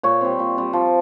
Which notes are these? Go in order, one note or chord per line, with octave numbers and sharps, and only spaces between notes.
A#2 C#5
G3 C4
A#2
G3 C4
F3